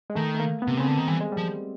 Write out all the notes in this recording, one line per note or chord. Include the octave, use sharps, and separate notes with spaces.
G#3
D#3 A3
A3
A#3
B3
C3
C#3 C4
D3 B3
D#3
E3 G3
G#3
G3
F3